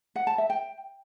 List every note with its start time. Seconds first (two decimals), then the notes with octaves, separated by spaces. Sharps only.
0.16 F#5
0.27 A5
0.38 E5
0.50 G5